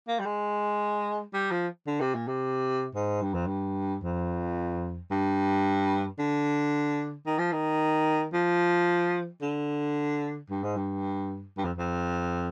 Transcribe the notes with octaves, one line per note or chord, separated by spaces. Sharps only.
A#3
G3
G#3
G3
F3
D3
C3
A#2
C3
G#2
G2
F2
G2
F2
G2
D3
D#3
F3
D#3
F3
D3
G2
G#2
G2
G2
F2
F2